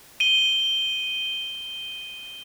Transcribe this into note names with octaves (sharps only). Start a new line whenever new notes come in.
D#7 G7